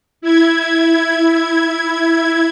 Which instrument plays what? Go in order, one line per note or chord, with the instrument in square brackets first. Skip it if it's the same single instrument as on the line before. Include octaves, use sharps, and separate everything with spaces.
[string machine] E4 G#6